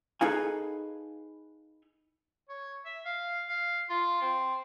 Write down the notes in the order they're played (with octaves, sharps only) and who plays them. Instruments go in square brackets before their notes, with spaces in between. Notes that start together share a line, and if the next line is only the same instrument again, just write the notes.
[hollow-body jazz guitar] D#4 G#4 A4 B4 F5 G#5
[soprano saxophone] C#5
E5
F5
F5
F4
C4